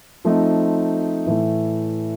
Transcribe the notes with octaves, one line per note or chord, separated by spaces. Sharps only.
F3 A3 C4 D#4
A2 E3 A3